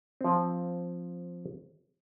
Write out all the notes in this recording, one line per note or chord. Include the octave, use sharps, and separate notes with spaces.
F3 C4